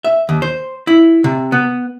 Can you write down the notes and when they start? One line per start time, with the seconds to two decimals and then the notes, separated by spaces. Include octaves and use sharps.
0.04 E5
0.29 D#2
0.42 C5
0.87 E4
1.24 C3
1.52 B3